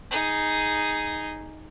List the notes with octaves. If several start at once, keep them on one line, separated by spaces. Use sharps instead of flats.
D#4 G#4